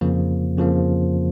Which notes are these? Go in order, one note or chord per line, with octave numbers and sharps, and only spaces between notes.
F2 C#3 F3 A#3
F2 C#3 F3 A#3